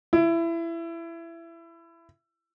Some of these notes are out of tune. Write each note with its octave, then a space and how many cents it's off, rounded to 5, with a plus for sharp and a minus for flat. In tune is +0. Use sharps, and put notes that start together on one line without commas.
E4 +20